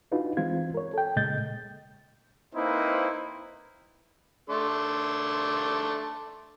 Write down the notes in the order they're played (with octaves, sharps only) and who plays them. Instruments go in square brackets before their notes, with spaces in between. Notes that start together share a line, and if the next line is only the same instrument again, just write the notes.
[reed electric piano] D4 D#4 F4 F#4 B4
E3 G#3 C4 F4 G#6
A#4 C#5
A4 G5
A#2 C#3 G#3 D#5 G6 A6
[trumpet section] A#3 C4 D#4 E4 B4 C5
[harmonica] A3 D4 C6